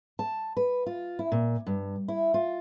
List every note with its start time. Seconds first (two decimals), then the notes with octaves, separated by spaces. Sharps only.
0.19 A5
0.57 B4
0.86 F4
1.19 E4
1.32 A#2
1.67 G2
2.08 E4
2.34 F4